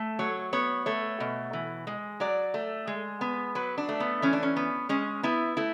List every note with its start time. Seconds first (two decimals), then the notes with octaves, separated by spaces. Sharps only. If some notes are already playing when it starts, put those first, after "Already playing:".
Already playing: A3
0.19 F#3 C#5
0.53 B3 C#5
0.86 A3 C#5
1.20 B2
1.53 E3
1.87 G#3
2.20 F#3 D5
2.54 A3
2.87 G#3
3.21 B3
3.55 F#3 B4
3.78 D4
3.89 A3
4.00 B3
4.22 E3 C#4
4.33 D4
4.43 C#4
4.56 B3
4.89 G#3 C#4
5.23 B3 E4
5.57 A3 E4